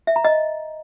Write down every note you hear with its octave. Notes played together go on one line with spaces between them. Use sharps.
E5
A#5
D#5